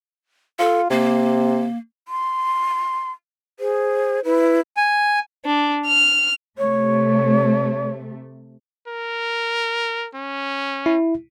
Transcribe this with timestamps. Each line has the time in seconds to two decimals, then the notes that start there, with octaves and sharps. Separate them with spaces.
0.59 F4 A4
0.90 C3 A#3
2.08 C6
3.60 G#4 C5
4.25 E4 B4
4.77 G#5
5.45 D4
5.87 F6
6.58 C3 A3 C#5
8.88 A#4
10.15 C#4
10.86 E4